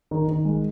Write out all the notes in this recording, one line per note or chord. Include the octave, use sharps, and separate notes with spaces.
D#3
D#3
G#3